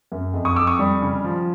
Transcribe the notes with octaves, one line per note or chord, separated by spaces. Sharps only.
F#2
F2
C#6 D#6
F2 D6 E6
C#6 D#6
G3
C#3
F3